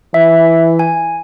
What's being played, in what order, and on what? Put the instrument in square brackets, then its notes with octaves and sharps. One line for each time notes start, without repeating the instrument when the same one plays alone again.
[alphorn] E3 [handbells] E5
[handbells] G#5